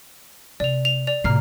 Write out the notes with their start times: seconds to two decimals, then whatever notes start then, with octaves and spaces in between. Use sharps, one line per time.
0.60 C3 D5 F7
0.85 F7
1.07 D5 F7
1.24 A2 C3 A#5 F6 C7